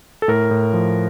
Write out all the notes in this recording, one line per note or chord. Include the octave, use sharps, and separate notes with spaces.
A4
A2 A#4
A2
F3